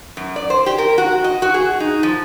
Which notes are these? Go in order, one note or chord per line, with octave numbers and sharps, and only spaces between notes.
F#2
D5
C5
G4
A#4
F#4
D#5
F#4
G#4
D#4
F3